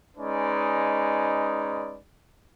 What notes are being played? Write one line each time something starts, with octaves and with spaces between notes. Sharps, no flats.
G#3 C#4 D#4 B4 D5